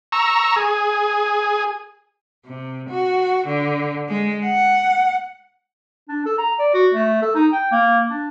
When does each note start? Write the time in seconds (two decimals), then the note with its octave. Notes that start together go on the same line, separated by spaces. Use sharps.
0.12 A#5 C#6 E6
0.56 G#4
2.46 C3
2.89 F#4
3.47 D3
4.09 G#3
4.45 F#5
6.09 D4
6.26 A4
6.38 A#5
6.59 D5
6.74 F#4
6.94 A3
7.22 A4
7.35 D#4
7.53 G5
7.72 A#3
8.10 D4